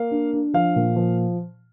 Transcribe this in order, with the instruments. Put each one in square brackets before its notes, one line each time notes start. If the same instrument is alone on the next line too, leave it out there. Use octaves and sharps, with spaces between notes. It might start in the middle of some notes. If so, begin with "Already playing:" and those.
Already playing: [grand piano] A#3 F5
D4
D4
F3 F5
A#2
F3